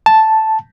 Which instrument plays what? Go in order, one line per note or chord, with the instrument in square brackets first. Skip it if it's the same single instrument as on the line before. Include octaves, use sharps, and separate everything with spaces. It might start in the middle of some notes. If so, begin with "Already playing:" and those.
[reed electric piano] A5